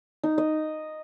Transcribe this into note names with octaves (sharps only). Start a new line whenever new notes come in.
D#4
D#5